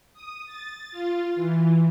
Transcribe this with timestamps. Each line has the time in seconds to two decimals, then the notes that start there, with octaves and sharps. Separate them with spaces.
0.14 D#6
0.46 A6
0.92 F4
1.36 E3